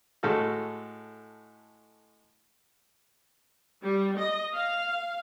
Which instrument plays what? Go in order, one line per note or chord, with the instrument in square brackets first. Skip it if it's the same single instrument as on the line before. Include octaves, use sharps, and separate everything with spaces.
[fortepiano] A2 G#3 F#4 A4 F6
[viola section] G3
D#5
F5